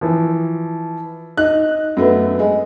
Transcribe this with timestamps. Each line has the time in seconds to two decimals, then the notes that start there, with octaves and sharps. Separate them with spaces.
0.01 E3 F3
1.37 D#4 F#6
1.97 F#2 A3 B3
2.39 G#3